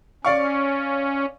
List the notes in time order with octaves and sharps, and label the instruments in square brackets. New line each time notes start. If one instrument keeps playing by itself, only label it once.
[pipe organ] C#4 [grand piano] D5 F5 C#6